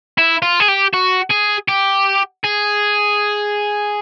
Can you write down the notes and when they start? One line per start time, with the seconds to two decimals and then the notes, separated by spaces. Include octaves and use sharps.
0.18 E4
0.42 F4
0.60 G#4
0.68 G4
0.94 F#4
1.31 G#4
1.69 G4
2.44 G#4